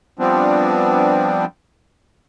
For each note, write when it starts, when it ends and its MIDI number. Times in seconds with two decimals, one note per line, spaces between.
0.19 1.45 53
0.19 1.45 55
0.19 1.45 59
0.19 1.45 60
0.19 1.45 62